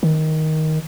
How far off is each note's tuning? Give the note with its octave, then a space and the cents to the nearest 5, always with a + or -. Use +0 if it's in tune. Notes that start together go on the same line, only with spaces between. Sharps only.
D#3 +10